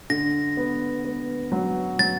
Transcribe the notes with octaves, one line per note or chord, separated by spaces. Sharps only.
D3 A#6
B3
B3
F#3
F#3 A6